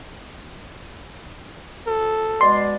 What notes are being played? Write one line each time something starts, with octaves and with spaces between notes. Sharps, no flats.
A4
B2 G#3 D5 C6